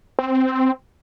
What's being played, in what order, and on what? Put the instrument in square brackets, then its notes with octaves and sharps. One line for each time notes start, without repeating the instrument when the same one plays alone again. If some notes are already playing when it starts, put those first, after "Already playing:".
[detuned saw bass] C4